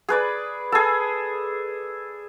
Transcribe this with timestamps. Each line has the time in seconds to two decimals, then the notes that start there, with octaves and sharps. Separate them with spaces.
0.09 G#4 B4 D5
0.72 G#4 A4